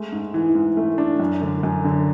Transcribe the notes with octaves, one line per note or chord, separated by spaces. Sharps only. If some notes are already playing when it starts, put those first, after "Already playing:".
Already playing: G#3 A3
G#2
E3
G#2
A3
D4
F#2
D3
F#2
D3